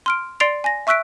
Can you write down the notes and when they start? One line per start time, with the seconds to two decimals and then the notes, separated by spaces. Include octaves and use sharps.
0.06 C6 F6 D7
0.40 D5 C6 A6 C7 D7 F7
0.64 G#5 A#6
0.87 E5 C#6 E6 F#6 B6 D7